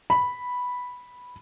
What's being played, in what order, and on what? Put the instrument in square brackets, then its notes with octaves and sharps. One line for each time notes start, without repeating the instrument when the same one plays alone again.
[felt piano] B5